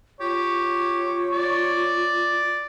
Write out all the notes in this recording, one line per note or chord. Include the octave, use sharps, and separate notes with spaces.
F4 G4 C#5
D5